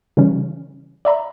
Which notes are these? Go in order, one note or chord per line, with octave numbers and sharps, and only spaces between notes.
C#3 E3 G3 C#4
D5 E5 A#5 B5